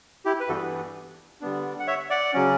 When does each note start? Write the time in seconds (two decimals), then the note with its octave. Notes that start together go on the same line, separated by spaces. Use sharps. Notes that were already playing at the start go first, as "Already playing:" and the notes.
0.25 E4 G4
0.40 B4
0.49 G2 E3 G3 B3 D4 F#4 A4
1.41 D3 G3 B3 D4
1.79 F#5
1.87 C#5 E5
2.10 D5 F#5
2.34 C#3 F#3 C#4